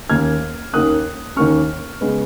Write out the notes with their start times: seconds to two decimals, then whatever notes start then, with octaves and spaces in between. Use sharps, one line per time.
0.10 D#2 D#3 A#3 C#4 F6 G#6
0.73 D#2 D#3 A#3 C#4 D#6 F#6
1.36 D#2 D#3 A#3 C#4 C#6 F6
2.01 C#3 G#3 B3